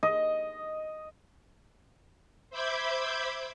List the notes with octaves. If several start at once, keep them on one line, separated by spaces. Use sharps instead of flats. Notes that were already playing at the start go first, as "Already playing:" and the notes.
D#5
C5 E5 B5 D6 G6 G#6